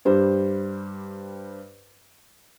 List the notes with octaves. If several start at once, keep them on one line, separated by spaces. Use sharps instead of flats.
G2 G3 C5